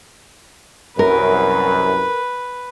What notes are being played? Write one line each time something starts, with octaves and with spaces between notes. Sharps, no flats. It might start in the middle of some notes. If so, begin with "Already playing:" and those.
C2 F#2 A#4 B4